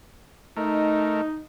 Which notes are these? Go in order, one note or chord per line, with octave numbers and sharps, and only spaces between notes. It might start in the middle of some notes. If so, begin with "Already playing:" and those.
A3 D#4 A#4